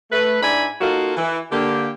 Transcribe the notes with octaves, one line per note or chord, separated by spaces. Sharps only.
A3 B4
G#2 D4 E4 D5 G#5 B5
A#3 D#4 F4 F#4 A4 A#4
E3
D3 A#3 G4